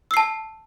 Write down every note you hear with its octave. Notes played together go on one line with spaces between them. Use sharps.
A5 E6 C7